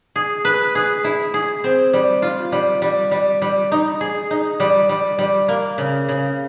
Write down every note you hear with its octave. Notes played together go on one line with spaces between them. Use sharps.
G#4
B4
G#4
E4
G#4
C4
G3
F4
G3
G3
G3
G3
D#4
G#4
D#4
G3
G3
G3
A#3
C#3
C#3